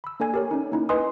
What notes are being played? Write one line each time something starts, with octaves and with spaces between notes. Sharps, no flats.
B5 E6
A#3 D4 A4 D5 G#5 G#6
G4 A#4 C#5
C#4 D#4
A#3 D#4 E4
B4 D#5 G#5 C6 D#6